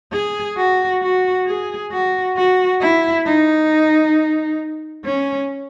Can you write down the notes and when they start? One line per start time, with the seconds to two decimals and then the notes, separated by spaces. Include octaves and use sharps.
0.13 G#4
0.58 F#4
1.02 F#4
1.47 G#4
1.92 F#4
2.37 F#4
2.81 E4
3.26 D#4
5.05 C#4